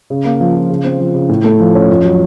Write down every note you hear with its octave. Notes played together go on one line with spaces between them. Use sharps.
C#3
A#3
F3
F4
C#3
C4
F3
C#3
A2
A3
F3
C#4
F2
F#3